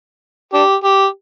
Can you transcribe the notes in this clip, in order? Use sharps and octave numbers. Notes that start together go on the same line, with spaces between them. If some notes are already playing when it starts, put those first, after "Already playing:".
D4 G4
G4